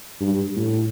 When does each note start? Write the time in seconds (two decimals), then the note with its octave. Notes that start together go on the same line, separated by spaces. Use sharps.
0.21 G2
0.56 A2